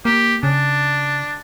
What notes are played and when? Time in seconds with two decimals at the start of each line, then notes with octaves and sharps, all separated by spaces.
0.05 A#3 G4
0.43 C#3 D4